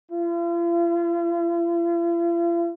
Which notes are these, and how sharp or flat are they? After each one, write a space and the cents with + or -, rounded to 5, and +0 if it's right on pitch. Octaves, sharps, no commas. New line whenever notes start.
F4 -45